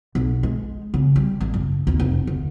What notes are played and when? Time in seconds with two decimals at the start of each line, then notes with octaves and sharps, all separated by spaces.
0.15 B1
0.43 G#3
0.94 C#3
1.16 G3
1.41 A1
1.54 F#1
1.87 D#2
2.00 F1
2.27 D2